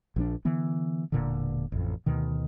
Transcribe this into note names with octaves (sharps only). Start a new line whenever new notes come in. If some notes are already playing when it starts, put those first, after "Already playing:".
A#1 F3 C#4 D4
D3 E3 B3
E1 A#2 D3
A1 F2
D2 B2 D#3